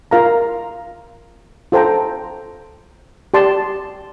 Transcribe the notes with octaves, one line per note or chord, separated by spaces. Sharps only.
F4 A#4 F5 A#5
F4 A4 C5 G5 A#5
G4 D5 A5 C6